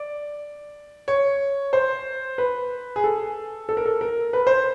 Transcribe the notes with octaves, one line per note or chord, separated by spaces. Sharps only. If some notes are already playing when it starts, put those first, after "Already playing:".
Already playing: D5
C#5
C5
B4
G#4
A4
A4
A#4
A4
A#4
B4
C5